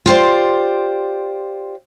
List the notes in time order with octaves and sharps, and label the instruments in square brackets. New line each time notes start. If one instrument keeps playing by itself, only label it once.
[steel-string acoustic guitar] F4 G4 C5 D5